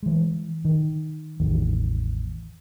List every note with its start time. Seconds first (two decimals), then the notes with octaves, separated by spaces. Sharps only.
0.03 E3 G#3
0.65 D#3
1.40 A1 E2 D#3